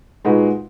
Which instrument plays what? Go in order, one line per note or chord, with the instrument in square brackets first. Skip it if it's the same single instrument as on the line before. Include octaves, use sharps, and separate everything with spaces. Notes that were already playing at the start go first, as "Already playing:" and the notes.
[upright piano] A#2 G#3 D#4 F#4 B4